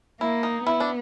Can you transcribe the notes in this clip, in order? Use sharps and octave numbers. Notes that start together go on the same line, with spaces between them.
A#3 E4
D#4
B3 E4
D4